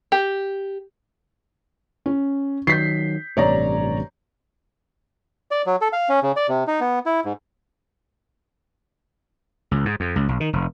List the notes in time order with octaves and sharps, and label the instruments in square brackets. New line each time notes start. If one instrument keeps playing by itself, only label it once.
[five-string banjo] G4
[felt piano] C#4
[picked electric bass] D#3 F#3 [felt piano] G6 B6 C7
[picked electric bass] A1 G2 C3 [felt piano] C#5 D5 A#5
[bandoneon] D5
F#3
A4
F5
C#4
C#3
D5
C3
D#4
B3
E4
G#2
[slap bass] C#2
G#2
F2
C#2
B1
D#3
F1